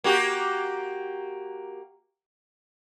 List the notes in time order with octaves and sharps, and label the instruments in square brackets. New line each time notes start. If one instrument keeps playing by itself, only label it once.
[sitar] A#3 F#4 G4